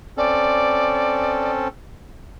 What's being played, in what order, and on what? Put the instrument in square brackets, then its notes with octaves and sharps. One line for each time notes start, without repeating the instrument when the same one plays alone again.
[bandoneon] C4 C#4 A4 [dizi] D5